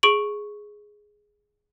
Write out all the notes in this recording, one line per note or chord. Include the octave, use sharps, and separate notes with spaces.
G#4 C#6 D7 F#7